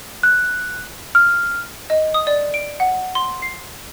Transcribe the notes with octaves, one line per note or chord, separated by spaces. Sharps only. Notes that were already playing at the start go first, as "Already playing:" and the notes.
F#6
F6
D#5
D#6
D5
D7
F#5
C6
C7